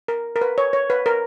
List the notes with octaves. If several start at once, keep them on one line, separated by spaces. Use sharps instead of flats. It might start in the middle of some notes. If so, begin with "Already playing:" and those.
A#4
A#4
B4
C#5
C#5
B4
A#4